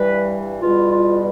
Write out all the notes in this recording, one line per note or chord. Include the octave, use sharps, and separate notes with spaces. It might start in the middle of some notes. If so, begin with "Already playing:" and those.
Already playing: G2 E3 G3 B4
E2 B2 G3 F4
F4